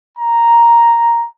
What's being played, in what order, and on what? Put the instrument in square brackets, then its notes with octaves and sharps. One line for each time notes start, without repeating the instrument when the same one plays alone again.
[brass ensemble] A#5